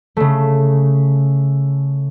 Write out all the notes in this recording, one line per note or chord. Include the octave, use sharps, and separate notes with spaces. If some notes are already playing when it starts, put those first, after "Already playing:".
C#3 A3